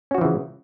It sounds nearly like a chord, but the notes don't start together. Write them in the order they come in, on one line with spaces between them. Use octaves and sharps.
C#4 F#4 F3 E3 C#3